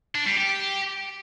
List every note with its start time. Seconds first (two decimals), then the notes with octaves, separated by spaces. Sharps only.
0.15 D4
0.26 G3
0.37 G4